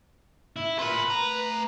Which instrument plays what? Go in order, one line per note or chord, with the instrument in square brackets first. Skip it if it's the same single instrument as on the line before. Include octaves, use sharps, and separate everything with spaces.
[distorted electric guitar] E4
[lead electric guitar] F4 A#4 [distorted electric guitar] B4
[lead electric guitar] A3 A#5